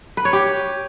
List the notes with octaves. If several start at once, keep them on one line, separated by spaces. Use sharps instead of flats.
B4
C#5
G4